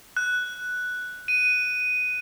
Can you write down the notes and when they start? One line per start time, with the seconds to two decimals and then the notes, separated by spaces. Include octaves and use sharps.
0.17 F#6
1.28 D#7